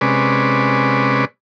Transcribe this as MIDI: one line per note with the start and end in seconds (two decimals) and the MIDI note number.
0.01 1.25 48
0.01 1.25 56
0.01 1.25 61
0.01 1.25 71
0.01 1.25 74